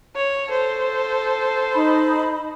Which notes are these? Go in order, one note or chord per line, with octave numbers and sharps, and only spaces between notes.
C#5
A4 C5
D#4 B5